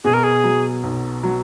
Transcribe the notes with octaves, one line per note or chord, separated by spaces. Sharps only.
B2 G#4
A#4
G#4
F#3
B1
F#3